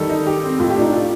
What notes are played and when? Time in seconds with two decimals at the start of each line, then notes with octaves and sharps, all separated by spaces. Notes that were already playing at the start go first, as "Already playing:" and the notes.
Already playing: D#3 G3 A4
0.09 D#4
0.27 G4
0.43 C4
0.59 A2 F4
0.70 G4
0.76 D4
0.81 D#4
0.92 F4 G4